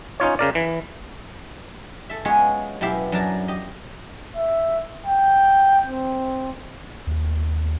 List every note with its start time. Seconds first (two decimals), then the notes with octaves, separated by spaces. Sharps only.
0.20 C#4 D#4 F4 C#5
0.39 C#3 A#4 D5
0.55 E3
2.10 A4 E5
2.25 G#3 B3 C#4 F4 G#4 C#5
2.81 F#2 B2 E4 G4 E5 F5
3.12 F#2 F#3 D4 A#4 A5 A#5
3.48 G4 D#5
4.36 E5
5.06 G5
5.87 C4
7.07 D#2